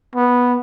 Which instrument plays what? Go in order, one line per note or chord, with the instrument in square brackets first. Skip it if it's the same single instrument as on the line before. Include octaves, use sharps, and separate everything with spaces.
[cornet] B3